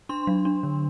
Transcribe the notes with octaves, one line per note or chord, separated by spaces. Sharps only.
D4 C6
F#3
D4
D3